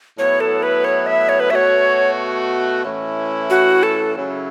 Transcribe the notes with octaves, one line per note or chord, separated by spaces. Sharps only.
A2 F#3 B3 E4 C#5
A4
B4
C#5
E5
C#5
B4
B2 A3 F#4 C#5 E5
A2 E3 C#4 E4
F#4
A4
C#3 F#3 C#4 E4